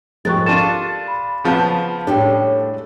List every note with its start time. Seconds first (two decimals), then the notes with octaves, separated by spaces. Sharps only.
0.25 G#2 F3 G#3 G4 A#4 C#6 F#6 A6
0.46 D4 F4 A4 C6 A6 D#7 E7
1.08 B5
1.44 C#3 F3 B3 F5 A5 G6
2.07 A2 G3 G#3 C#4 D4 G4